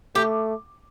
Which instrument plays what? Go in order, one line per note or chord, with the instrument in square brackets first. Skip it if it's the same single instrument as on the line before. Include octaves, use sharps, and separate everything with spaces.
[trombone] A3 [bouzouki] G4